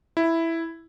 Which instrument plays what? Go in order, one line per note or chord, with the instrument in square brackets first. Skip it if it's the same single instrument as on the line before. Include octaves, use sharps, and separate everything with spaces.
[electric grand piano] E4